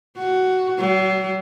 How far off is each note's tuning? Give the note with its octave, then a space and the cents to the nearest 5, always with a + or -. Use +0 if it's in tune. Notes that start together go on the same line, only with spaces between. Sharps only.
F#4 +10
F#3 +45